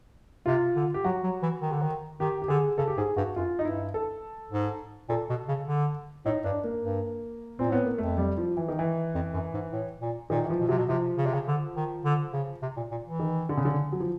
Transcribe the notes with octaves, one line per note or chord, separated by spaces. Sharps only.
C3 F4
D3
G4
F#3 F#4
F#3
E3
D#3
D3
D#3
D#3 G4
G4
D3 G#4
C#3 A4
G4
G#2 G#4
G2 F#4
F#2 F4
D#4
G2 E4
A4
G#2
A#2 A4
B2
C#3
D3
A2 D#4
G2 D4
A#3
G2
A#2 C4
A2 B3
A#3
F2 A3
G3
F3
E3
D#3
E3
F2
F#2
G#2
A2
A#2
A#2 D#3
E3
F3
B2
C3 F#3
B2
C3 F3
C#3
C3
C#3
D3
D#3
D3
C#3
C3
A#2
A#2
E3
D#3
D3
C#3
D3
F#3
F3